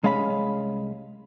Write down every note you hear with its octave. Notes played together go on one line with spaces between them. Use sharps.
C2 G#3 C#4 F5 A#5 B5